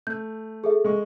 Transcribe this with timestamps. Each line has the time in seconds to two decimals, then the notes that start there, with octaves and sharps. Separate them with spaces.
0.07 A3 G6
0.64 G#4 A4 E5
0.85 G#3 C#6